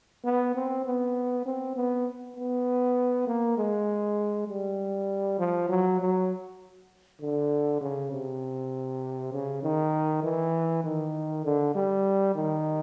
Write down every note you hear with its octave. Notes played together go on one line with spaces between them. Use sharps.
B3
C4
B3
C4
B3
B3
A#3
G#3
G3
F3
F#3
F#3
D3
C#3
C3
C#3
D#3
E3
D#3
D3
G3
D#3